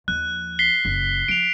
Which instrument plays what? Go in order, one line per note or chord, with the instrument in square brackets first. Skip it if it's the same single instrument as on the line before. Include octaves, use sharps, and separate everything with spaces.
[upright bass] D#2 F3 [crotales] F#6
[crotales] B6 C7 G7
[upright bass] F#1
[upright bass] F3 [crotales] D7 F7